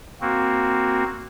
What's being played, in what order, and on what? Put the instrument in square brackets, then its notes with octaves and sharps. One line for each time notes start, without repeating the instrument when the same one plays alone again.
[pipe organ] A#3 C4 F#4